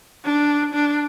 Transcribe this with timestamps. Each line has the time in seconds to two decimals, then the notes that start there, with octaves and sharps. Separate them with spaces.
0.25 D4
0.74 D4